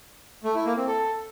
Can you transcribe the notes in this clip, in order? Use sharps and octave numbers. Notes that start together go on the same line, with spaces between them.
A3
E4
A#3
C4
A4